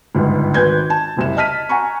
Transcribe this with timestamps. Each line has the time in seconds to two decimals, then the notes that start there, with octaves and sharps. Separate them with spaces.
0.15 G1 C#2 G#2
0.54 G#1 B4 G6 G#6
0.90 A5
1.16 F#1 C2 E7
1.37 D#5 A5 F6 B6 D#7
1.69 F#5 G#5 A#5 C#6